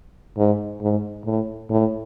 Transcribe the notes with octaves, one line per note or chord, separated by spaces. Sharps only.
G#2
G#2
A2
A2